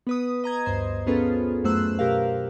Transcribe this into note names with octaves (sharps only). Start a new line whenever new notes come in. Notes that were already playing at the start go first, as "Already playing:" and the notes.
B3 B4 D#6
D#5 A#5 G#6
D2 G2 C5
B3 C#4 F4 G#4 A4 B4
F#2 F#3 A3 C5 E6 F#6
B2 G4 A#4 F5